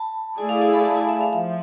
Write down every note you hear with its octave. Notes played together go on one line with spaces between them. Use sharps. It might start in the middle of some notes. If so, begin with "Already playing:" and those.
Already playing: A5 B5
A3 E4 G#4 D5 G#5
F5
G#5
B5
A5
G#5
E5
F5
F3 E5